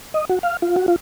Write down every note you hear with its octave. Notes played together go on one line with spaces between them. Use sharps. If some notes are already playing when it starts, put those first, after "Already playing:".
D#5
F#4
F5
F4
F#4
F4